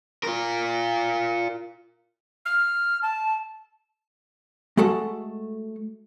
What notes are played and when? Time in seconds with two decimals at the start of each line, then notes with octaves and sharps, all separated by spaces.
0.23 F4 A#4
2.45 F6
3.02 A5
4.77 G#3 A3 F#4 A4 F#5